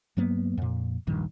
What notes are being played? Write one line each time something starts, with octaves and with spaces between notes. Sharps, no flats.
G2 F#3 A#3 B3
F2 A#2
D1 A#1 G2 D#3